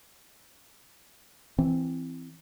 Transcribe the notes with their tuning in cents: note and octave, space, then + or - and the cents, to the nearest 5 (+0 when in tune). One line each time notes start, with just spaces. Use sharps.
E3 +5 C4 -5